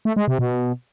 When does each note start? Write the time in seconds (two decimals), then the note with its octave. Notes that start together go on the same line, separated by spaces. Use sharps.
0.05 A3
0.16 G#3
0.28 C3
0.39 B2